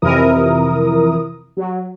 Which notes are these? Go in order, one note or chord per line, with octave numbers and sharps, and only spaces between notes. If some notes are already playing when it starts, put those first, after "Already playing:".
F2 C3 E3 E4 A#4 D#6
F#3